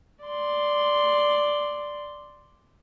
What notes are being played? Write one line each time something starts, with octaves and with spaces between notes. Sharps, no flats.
D5 C6